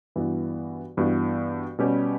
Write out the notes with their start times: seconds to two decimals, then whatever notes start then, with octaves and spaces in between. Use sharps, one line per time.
0.16 G2 E3 B3 F#4
0.97 G2 E3 B3 F#4
1.79 B2 G3 C#4 G4 B4